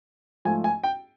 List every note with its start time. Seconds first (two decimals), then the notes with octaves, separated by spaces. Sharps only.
0.45 G#2 F3 A3 G#5
0.64 G#5
0.84 G5